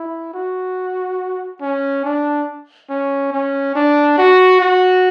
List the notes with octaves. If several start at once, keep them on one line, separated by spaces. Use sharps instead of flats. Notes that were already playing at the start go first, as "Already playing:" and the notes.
Already playing: E4
F#4
C#4
D4
C#4
C#4
D4
F#4
F#4